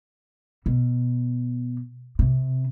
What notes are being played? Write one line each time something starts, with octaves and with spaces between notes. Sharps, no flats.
B2
C3